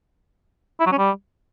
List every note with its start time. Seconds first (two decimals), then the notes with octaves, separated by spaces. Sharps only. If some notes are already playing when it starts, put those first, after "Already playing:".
0.80 E4
0.86 F#3
0.92 C#4
0.98 G3